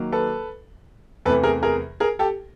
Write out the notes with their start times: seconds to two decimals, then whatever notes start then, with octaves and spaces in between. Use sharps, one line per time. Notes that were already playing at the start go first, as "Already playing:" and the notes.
Already playing: D#3 F#3 A#3
0.12 A4 B4
1.25 E2 C3 E3 A3 A4 B4
1.43 G#4 A#4
1.63 G#4 A#4
2.00 G#4 A#4
2.19 G4 A4